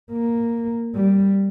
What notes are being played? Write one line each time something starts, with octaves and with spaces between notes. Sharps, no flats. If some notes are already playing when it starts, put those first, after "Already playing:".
A#3
G3